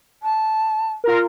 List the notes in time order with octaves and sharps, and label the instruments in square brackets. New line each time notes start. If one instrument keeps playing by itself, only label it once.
[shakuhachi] A5
[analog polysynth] F4 A#4